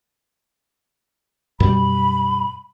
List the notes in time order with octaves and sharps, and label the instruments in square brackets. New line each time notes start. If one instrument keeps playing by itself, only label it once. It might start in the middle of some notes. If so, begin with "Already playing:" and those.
[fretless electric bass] F#2 B2 G3 [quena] B5